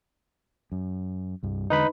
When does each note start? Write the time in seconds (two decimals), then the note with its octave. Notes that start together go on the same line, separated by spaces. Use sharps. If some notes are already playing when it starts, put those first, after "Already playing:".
0.72 F#2
1.43 C2 G2
1.70 E2 D3 G#3 D#4 B4 B5